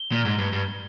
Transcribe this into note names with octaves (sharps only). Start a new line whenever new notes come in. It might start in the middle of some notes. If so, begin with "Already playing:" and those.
Already playing: G7
A#2
G#2
G2
G2